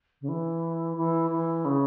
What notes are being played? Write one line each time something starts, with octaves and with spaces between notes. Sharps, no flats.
C#3
E3
E3
E3
C#3